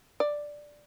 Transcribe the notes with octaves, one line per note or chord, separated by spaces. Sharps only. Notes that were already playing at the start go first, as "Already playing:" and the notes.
D5